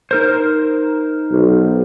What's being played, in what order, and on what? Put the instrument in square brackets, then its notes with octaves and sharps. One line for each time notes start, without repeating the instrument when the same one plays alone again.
[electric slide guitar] D#4 A#4 C5
[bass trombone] B1